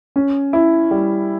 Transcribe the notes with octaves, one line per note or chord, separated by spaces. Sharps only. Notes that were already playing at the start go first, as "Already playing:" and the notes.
C#4
E4
G3